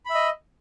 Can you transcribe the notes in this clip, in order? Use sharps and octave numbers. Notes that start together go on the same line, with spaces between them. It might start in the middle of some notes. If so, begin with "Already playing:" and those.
D#5 E5 B5